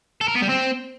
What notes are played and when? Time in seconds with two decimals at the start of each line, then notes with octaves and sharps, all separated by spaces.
0.21 A4
0.28 A#4
0.35 B3
0.42 G3
0.49 C4